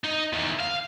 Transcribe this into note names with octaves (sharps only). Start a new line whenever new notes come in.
D#4
E2 D#3
F5